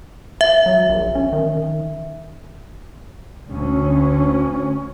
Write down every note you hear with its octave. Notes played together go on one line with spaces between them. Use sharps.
E5
F#3
A#1
C#4
D#3
D2 C#4